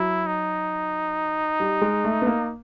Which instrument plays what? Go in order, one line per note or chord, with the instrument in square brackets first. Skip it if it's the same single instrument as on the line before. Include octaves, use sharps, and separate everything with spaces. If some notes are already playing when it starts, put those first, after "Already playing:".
Already playing: [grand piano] F#3 [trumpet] E4
[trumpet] D#4
[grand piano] G3
G#3
A3
B3
A#3